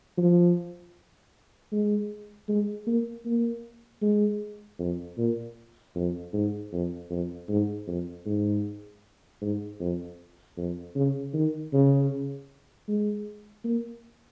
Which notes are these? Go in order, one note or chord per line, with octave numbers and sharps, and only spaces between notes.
F3
G#3
G#3
A#3
A#3
G#3
F2
A#2
F2
G#2
F2
F2
G#2
F2
G#2
G#2
F2
F2
C#3
D#3
C#3
G#3
A#3